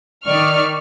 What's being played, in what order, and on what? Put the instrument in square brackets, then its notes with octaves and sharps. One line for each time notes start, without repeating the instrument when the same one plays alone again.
[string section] D#3 D5 C#6 F6